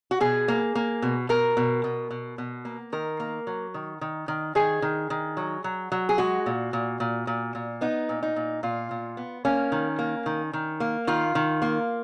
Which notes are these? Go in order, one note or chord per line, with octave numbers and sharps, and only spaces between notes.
F#4
B2 G#4
A#3
A#3
B2
B2 A#4
B2
B2
B2
B2
A#3
D#3 A#4
A#3
F#3
D#3
D#3
D#3
D#3 G#4
D#3
D#3
F#3
F#3
F#3
G#4
G#3 F#4
A#2
A#2
A#2
A#2
A#2
B3 D#4
A#2
D#4
A#2
A#2 F4
A#2
B3
A#3 C#4
D#3
A#3
D#3
D#3
A#3
D#3 F4
D#3
A#3